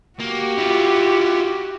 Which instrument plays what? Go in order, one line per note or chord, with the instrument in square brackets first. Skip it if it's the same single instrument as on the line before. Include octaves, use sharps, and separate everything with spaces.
[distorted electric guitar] A#3 [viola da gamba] F#4 G4
[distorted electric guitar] E4 F4